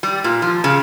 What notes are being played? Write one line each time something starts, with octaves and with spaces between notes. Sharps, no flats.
G3
A#2
F3
C#3